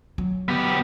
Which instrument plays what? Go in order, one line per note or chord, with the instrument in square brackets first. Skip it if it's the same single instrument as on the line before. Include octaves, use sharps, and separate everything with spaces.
[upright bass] F#3
[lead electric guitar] B3 G4